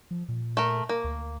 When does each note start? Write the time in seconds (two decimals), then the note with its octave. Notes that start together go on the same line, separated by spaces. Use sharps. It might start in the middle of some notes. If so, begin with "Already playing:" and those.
0.11 F3
0.28 A#2
0.57 A3 A#4
0.89 A#3
1.04 D2